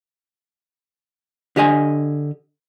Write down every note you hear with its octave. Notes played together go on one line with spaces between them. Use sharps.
D3 G4 D#5 G#5